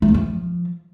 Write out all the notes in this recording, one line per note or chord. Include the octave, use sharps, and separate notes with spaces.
A3
E2
F3